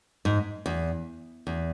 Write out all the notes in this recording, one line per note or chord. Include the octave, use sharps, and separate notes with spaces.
G#2
E2
E2